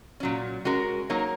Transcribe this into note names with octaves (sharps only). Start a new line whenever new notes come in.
A#2 F#3 C#4
G#3 C#4 F#4 A#4
F#3 A#3 D#4 A#4 C#5